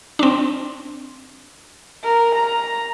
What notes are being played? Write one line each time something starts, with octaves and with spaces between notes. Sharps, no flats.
C4 D4
A#4
A#5